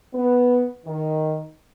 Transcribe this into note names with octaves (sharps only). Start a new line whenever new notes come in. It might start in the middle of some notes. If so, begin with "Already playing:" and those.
B3
D#3